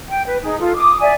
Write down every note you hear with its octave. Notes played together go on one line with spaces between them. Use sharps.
G5
B4
D#4 G#4
F4 A4
D6 D#6
D5 E5 G#5